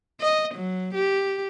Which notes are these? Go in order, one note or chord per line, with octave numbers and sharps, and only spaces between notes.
D#5
F#3
G4